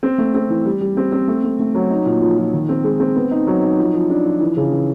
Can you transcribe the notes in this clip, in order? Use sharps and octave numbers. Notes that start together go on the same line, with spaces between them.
C4
A3
C4
E3
G3
G3
C4
C4
A3
A3
A3
F#3
D#4
A#2
F3
F3
D#3
C4
G#3
C4
B3
D#4
F#3
D#4
F3
F3
D4
F3
E3
C#3
E3